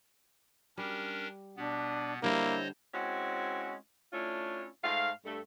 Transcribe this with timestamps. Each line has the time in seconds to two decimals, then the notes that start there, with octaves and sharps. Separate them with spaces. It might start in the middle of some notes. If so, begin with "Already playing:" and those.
0.78 G3 C#4 D4 A#4
1.57 B2 B3 D4
2.23 D3 G3 A#3 E4 A#4 C5 C#5 D#5
2.94 G#3 C4 C#4 E4 F#4
4.13 A3 C#4 D4 E4 F4
4.84 G#2 A3 F5
5.25 G2 A3